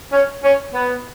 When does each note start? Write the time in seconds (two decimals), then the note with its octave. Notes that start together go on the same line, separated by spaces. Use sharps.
0.12 C#4
0.44 C#4
0.74 B3